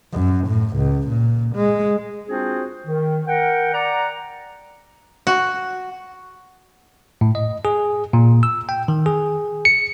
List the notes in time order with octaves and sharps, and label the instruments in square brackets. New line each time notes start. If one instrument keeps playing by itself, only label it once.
[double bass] F#2
A2
C#2
A#2
G#3
[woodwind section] C4 D4 F4 F#4 G#4 C5
D#3
A#4 F#5 G5
D5 F#5 A#5
[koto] F#4
[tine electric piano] A2
D#5
G#4
A#2
E6
G5
D#3
G#4
C#7